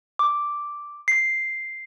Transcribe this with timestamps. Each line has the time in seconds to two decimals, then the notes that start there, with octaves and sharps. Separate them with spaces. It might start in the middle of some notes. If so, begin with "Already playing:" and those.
0.19 D6
1.08 C7